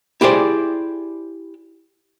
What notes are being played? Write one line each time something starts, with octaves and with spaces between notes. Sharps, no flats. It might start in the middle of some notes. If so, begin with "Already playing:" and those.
E4 G4 G#4 C5 D5